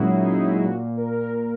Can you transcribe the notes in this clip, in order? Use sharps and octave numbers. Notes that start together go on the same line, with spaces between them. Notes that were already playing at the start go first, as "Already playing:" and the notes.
Already playing: A#2 F#3 G#3 C#4 E4 F#4 G#4
D#4
E4
G#4
E4
F#4
A#2 F#4
A#4